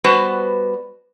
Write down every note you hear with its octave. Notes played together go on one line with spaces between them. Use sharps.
G3 B3 F#4 B4 C5 A5